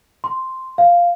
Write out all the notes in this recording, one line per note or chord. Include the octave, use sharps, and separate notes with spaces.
C6
F5